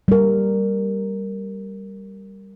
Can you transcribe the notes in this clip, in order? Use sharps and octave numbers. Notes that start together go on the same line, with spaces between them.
G3 A#4